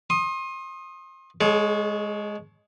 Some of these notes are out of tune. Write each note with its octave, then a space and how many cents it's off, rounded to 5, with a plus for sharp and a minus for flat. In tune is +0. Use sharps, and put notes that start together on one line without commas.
C6 +35 D#6 +0
G#3 +0 A4 -45 C#5 +0